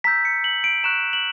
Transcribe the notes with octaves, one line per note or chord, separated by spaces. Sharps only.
A#5 E6 G6 B6
C#7
F#7
D7
A#5 C#6 F#6 E7
F#7